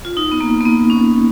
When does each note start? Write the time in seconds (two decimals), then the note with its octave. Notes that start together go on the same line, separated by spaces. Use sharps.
0.05 F4
0.17 D#4
0.32 B3
0.41 A#3
0.61 A#3
0.65 B3
0.90 C#4